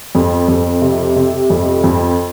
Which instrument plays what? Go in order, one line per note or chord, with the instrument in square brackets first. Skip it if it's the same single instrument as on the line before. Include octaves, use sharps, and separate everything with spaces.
[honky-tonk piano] F2
F2
C3
C3
F2
F2